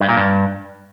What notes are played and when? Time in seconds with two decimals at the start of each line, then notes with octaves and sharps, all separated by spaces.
0.01 G2
0.09 A#2
0.17 G2